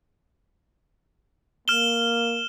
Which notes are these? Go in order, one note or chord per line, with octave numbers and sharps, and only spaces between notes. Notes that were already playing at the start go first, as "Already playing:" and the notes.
A#3 F6 E7 G7